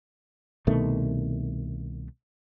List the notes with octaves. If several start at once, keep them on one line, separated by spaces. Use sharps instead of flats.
C2 B2 D#3 A3